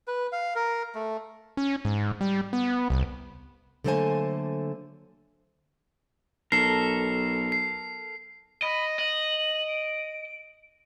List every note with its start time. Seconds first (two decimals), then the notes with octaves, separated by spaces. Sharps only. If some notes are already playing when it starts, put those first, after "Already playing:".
0.08 B4
0.33 F5
0.55 A#4
0.95 A3
1.57 C#4
1.85 G#2
2.21 G3
2.53 B3
2.90 C2
3.84 D3 F#3 A3 A#3 C5 G#5
6.52 B1 A4 A#4 C7
7.52 C7
8.62 D#5 B5
8.99 D#5 F#7
9.68 D7